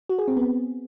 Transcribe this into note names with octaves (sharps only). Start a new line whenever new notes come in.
F#4
G#4
C4
B3